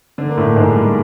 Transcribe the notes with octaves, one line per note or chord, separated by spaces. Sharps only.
D3 D4
A#3
A2 A3
G#2 G#3
G3